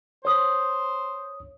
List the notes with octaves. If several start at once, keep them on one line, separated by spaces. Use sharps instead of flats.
C5 C#5 D#6